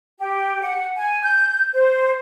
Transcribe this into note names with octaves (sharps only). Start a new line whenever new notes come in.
G4
F#5
G#5
G6
C5